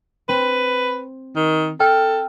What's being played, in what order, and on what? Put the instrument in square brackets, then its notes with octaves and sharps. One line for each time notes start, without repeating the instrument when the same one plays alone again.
[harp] C4 [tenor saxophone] B4
[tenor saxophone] D#3
[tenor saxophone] A4 [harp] G5 E6 F6